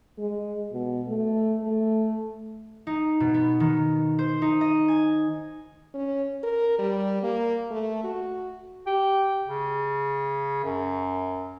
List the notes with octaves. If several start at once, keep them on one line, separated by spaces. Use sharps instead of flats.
G#3
B2
A3
A3
D#4
B2
B3
D#3
C5
D#4
D#5
G#5
C#4
A#4
G3
A#3
A3
F#4
G4
C#3
F#2